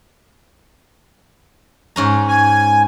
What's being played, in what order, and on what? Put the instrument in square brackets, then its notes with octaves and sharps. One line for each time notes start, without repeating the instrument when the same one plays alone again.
[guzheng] G#2 C#4 A#5
[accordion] G#5